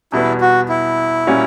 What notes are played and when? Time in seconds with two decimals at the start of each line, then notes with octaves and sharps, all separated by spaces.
0.12 E2 B2 G3 B3 E4
0.41 F#4
0.69 E4
1.27 A#2 G3 C#4 F#4